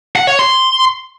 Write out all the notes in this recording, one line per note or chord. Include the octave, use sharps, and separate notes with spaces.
F#5
C#5
C6